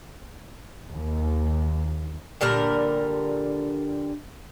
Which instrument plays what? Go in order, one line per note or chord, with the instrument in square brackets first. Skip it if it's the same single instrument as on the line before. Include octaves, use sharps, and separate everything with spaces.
[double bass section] D#2
[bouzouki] A#2 D3 G3 A#4